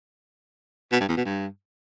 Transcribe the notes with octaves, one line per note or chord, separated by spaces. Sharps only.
B2
G2
E2
B2
G2